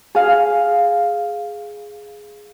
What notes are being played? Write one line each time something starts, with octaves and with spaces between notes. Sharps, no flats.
G#4 F5